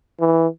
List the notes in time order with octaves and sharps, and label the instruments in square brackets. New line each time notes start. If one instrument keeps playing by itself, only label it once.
[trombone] E3